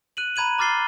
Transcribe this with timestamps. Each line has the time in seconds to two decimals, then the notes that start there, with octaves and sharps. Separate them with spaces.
0.17 F#6 D#7 F#7
0.36 A#5 B5 G#6 D#7 F#7
0.58 A#5 D6 F6 A6 C7 G7